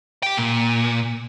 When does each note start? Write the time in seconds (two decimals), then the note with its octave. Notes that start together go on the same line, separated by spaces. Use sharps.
0.23 G4 G5
0.37 A#2